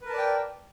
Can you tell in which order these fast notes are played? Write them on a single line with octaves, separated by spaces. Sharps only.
B4 A#4 A5 D5 G5